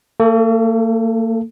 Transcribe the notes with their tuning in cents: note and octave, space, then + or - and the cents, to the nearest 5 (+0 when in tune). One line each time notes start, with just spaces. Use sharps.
A#3 -45 A4 +0